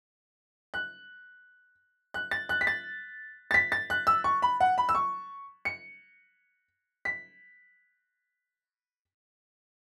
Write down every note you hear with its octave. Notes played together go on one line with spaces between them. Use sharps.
F#6
F#6
A6
F#6
B6
A6
A6
B6
A6
F#6
E6
C#6
B5
F#5
B5
E6
C#6
C#7
B6